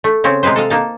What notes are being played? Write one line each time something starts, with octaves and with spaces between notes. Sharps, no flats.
A3
C#3 C4 C#4
C3 G#3 D#4 B4 C5
A4 D#5 F5
A#3 D#4 A5